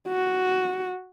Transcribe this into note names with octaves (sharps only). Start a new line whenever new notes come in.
F#4